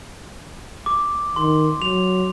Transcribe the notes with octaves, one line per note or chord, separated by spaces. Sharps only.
D6
D#3 C6
F#3 F7